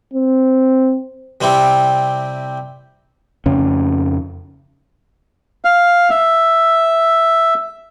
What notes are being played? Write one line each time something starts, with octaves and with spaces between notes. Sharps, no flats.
C4
C3 G3 C4 E4 G4
F2 C#3 C#4
F5
E5